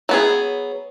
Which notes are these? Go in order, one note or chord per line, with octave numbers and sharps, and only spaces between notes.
F#3 B3 G#4